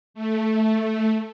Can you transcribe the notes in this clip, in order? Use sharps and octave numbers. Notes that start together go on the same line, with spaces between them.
A3